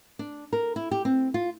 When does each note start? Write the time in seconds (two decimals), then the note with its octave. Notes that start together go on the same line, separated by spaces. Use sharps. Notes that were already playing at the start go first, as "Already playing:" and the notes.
0.19 D4
0.53 A#4
0.76 E4
0.91 G4
1.05 C4
1.34 F4